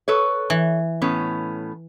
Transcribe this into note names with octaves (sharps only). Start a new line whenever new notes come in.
A4 B4 C#5
E3
A2 B3 C#4